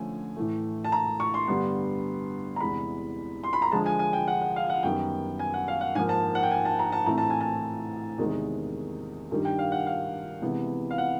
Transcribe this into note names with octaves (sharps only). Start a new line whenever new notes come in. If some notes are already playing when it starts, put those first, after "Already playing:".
Already playing: D3 F3 A3 C#4 G#5
A2 E3 A3
A5
A#5
C#6
C6
G2 D3 G3 B3
A#5
E2 C3 E3 G#3 B5
C6
B5
A#5
D3 F3 G#3 A5
G#5
G#5
G5
F#5
F#5
F5
F#5
F#2 D#3 G3 B3 G5
G#5
F#5
F5
F#5
G#2 F3 A#3 G#5
A5
F#5
G5
G#5
A5
A#5
A5
A2 E3 A3 C4 A#5
A5
G#5
A5
E2 C3 D#3 G#3
G2 D#3 G3
G5
F5
F#5
F5
C3 E3 G#3 B3
F5
F#5